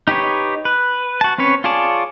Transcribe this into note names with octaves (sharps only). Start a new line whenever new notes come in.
D#4 G4 B4 C#5
B4
F#4 A5
C4 C#4 B4 C#5
F4 G#4 C#5 D5 A5